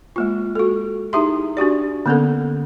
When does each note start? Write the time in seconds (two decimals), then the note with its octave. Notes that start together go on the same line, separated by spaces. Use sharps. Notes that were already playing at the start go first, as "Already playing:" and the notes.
0.16 G#3 A#3 F4
0.55 F#4 A4
1.13 D#4 E4 G4 G#4 E5 C6
1.57 D4 F#4 G4 D5
2.06 D3 A#3 B3 C#4 A4 A#4